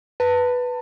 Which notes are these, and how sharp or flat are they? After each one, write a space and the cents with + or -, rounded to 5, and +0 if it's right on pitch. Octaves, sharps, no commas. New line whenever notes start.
B4 +0 A5 +30